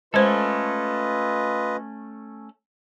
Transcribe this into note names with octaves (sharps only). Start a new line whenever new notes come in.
G#3 A3 C#4 F4 A4 B4 C5 D#5